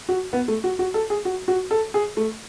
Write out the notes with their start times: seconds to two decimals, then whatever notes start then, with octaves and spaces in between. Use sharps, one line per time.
0.09 F#4
0.33 B3
0.48 A3
0.64 F#4
0.79 F#4
0.94 A4
1.10 G#4
1.25 F#4
1.48 F#4
1.71 A4
1.94 G#4
2.17 A3